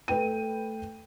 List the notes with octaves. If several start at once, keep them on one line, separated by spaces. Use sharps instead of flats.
A3 B4 G5 D#7